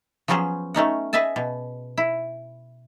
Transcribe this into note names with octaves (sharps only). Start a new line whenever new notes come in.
F3 F#3 B3 C#4 G#4 C5
A3 C#4 D#4 F#5
G#4 B4 D#5 E5 G#5 A5
B2
E4